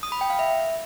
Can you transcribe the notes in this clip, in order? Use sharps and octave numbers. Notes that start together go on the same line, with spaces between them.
D#6
B5
G5
F5
E5